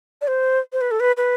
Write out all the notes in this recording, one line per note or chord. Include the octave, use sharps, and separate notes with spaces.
D5
C5
C5
B4
A4
B4
B4